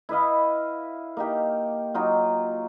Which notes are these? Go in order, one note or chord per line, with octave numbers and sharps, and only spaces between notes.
E4 B4 D#5 F5
A#3 D#4 G4
F#3 D#4 F4